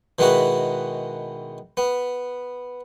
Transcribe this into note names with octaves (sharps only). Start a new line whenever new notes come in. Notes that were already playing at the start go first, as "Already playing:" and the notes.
B2 D#3 G#3 B3 E4 F#4
B3